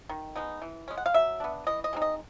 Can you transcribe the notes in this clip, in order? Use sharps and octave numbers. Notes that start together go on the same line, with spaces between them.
D#3
G#3 B3 D#4
E3
G#3 C#4
F#5
F5
F#3 E5
B3 D4
E3 D#5
D#5
G#3 C4 D#4
D#5